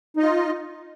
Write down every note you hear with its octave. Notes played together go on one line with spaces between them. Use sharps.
D#4 F4 D#5